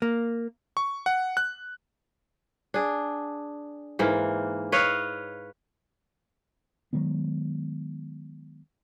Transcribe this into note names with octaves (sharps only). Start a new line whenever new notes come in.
A#3
C#6
F#5
F#6
D4 G#4
G#2 E3 A#3
B4 C#5 D#5 F5
D#3 F#3 G#3 B3